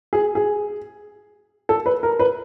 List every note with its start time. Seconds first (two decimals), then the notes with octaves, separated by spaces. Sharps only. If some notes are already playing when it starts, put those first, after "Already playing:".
0.13 G#4
0.35 G#4
1.69 A4
1.86 B4
2.03 A#4
2.19 B4